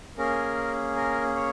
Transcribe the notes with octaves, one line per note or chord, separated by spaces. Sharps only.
A#3 C#4 G#4 A#4
A#4
C#5